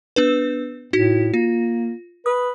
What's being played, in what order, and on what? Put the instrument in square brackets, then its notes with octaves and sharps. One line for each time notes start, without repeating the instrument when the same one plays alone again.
[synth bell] B3 D4 B4
[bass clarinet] A2 [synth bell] D#4 F#4
[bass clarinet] A#3 [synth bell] F4
[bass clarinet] B4 [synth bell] D#6